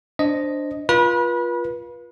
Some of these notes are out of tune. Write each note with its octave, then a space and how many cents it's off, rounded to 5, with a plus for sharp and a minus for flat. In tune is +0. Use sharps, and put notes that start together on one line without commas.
D4 +0 C5 +0 D#5 +0
F4 +0 B4 -35 B5 -25